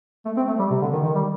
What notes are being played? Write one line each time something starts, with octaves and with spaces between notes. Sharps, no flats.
A3
C4
A3
G3
C3
D3
D#3
D#3
G3